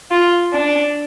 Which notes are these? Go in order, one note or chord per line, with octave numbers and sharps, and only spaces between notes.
F4
D4